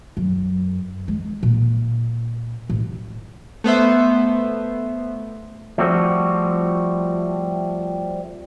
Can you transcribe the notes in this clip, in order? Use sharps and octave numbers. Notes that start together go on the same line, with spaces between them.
F#2
G#3
A#2
A1
A3 B3 C5 E5
F3 G3 A3 C4 F#4